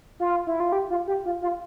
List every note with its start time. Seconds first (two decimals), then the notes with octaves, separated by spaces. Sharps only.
0.20 F4
0.47 E4
0.60 F4
0.72 G4
0.90 F4
1.08 G4
1.25 F4
1.42 F4